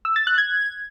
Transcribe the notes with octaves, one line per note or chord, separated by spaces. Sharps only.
E6
A6
F#6
G#6